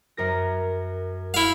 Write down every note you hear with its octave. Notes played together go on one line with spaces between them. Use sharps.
F#2 A#4 A#6
E4 F5